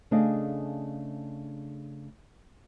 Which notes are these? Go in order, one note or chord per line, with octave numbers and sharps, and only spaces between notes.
C#3 A3 D4 G#4 D#5 F5